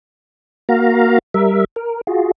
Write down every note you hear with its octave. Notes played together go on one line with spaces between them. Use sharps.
A#3 F#4 F5 A#5
G3 A#4 E5
A#4
F4 F#4 G#4